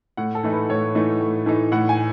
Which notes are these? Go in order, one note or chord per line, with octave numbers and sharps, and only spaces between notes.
A2 F#5
A4
E3 A3 D#4
B4
A2 C#5
E3 A3 D#4
A2
E3 A3 D#4
A2 F#5
G#5